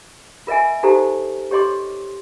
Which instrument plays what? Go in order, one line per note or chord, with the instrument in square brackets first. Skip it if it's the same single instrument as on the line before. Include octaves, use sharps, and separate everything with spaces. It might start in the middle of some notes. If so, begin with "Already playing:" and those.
[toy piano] F4 A#4 D#5 E5 G#5
D#4 F#4 G4 A4 C5 A#5
G4 C#5 D#5 C6 D6